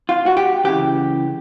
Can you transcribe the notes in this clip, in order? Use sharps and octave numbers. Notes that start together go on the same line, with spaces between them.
F4
F#4
G4
C#2 C#3 E3 G4